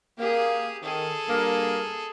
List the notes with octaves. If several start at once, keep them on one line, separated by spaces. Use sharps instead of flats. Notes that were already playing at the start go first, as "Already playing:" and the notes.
A#3 G4 G#4
D#3 G#4 A4
G2 A#3